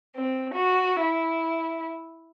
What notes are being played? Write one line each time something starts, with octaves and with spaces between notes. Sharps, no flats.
C4
F#4
E4